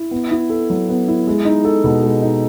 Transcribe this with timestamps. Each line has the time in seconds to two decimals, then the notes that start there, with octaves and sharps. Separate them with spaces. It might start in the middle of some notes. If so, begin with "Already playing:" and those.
Already playing: E4
0.11 B3
0.31 E4
0.50 A4
0.70 F#3
0.89 B3
1.08 E4
1.27 G#3
1.45 D#4
1.65 A4
1.84 B2
2.03 G#3
2.22 D#4